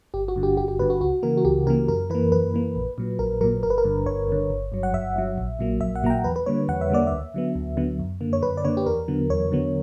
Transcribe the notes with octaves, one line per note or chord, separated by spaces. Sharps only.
G1 G4
F#4
G2 D3
G4
G1 G4
G4
G2 D3 B4
F#4
C#2 F#4
C#3 E3 A#3 A#4
F#4
C#2 G4
C#3 E3 A#3 A#4
F#2 A#4
E3 A#3 B4
F#2 B4
E3 A#3
A#1
A#2 F#3
A#1 A#4
A#2 F#3 A#4
G1 A#4
B4
A#4
G2 D3
G1 C#5
G2 D3
G1
G2 F#3
F#5
G1 E5
G2 F#3
A#1
A#2 F#3 A#3
A#1 E5
F#5
A#2 F#3 A#3 A#5
G5
E2 B4
B4
D3 G3 A#3 C#5
E2 F#5
E5
D3 G3 A#3 D5
D2 E5
D3 F#3 B3
D2
D3 F#3 B3
F#2
D3 A#3
C#5
F#2 B4
D5
D3 A#3 C#5
G4
E2 A#4
D3 F#3 B3
E2 C#5
D3 F#3 B3